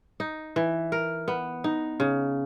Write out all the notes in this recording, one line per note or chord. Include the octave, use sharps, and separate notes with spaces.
D#4
E3
A#4
B3
D#4
C#3